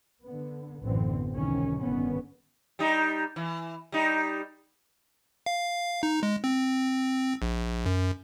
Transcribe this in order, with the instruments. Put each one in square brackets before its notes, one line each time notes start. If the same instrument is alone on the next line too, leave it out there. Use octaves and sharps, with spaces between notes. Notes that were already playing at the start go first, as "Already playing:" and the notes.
[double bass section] D3 B3
A1 F#2 D3 E3 B3 C4
C#2 C3 D#3 E3 C#4
G1 D3 D#3 B3 C#4
[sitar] G3 D#4
E3
G3 D#4
[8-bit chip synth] F5
D#4
G#3
C4
A#1
F#2